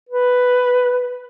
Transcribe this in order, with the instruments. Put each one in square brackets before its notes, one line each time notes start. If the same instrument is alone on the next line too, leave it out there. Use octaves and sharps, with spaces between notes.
[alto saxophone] B4